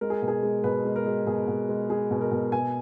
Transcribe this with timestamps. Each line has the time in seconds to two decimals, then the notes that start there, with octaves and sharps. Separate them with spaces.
0.01 G#3 A#4
0.10 G#4
0.22 B2
0.28 G#4
0.43 G#3
0.64 B2 B4
0.85 G#3
0.96 A#4
1.06 G#3
1.27 B2 G#4
1.48 B2
1.69 G#3
1.90 G#3 G#4
2.11 B2
2.21 A#4
2.31 B2
2.52 B2 G#5